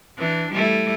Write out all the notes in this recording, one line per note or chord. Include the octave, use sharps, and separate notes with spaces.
E3 D4
G3 A3 E4